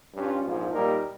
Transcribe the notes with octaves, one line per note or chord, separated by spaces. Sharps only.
G2 G3 C#4 F4
A#1 G#2 F3
A#2 G3 A#3 D#4 A#4